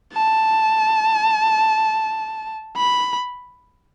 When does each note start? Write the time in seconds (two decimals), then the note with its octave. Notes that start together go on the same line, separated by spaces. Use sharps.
0.13 A5
2.77 B5